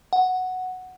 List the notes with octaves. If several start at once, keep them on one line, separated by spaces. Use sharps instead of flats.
F#5